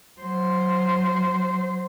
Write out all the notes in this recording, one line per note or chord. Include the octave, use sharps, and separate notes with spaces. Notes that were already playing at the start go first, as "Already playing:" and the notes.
F#3 C5